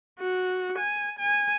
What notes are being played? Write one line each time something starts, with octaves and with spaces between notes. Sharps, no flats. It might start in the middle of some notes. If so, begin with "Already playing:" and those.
F#4
G#5
G#5